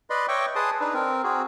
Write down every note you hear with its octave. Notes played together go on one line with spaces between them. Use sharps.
B4 D5 D#5 B5 C6
C#5 D#5 E5 G5 C#6 D6
G#4 B4 A5 C6 D#6
D4 D#4 B4
C4 A#4
C4 F#4 G#4